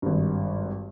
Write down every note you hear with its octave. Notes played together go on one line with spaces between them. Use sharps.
G#1 G2